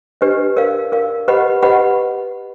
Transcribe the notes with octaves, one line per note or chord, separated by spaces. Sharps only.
D4 G4 B4 D#5
A#4 D5 F5
A#4 D5 F5
G4 B4 D#5 F#5 B5
G4 B4 D#5 F#5 B5